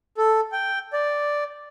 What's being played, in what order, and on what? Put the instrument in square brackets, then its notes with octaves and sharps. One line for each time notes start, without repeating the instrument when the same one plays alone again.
[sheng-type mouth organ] A4
G5
D5